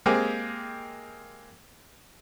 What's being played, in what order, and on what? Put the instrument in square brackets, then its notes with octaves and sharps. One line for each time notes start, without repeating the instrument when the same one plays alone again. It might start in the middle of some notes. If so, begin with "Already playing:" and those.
[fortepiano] G#3 A#3 C4 G4 G#4